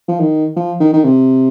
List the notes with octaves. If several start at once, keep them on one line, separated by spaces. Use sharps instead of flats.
F3
D#3
F3
D#3
D#3
C3